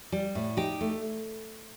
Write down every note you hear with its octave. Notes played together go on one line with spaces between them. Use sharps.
G3
A2
D#4 G4
A3